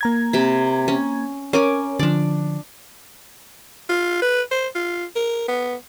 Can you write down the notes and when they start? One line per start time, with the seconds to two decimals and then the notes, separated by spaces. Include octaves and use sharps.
0.01 A#3 A#5 G#6
0.33 C3 B5
0.88 C#4
1.53 C#4 A#4 C#5 G#5 D6
1.99 D3 F3 D4 D5
3.89 F4
4.22 B4
4.51 C5
4.75 F4
5.16 A#4
5.49 B3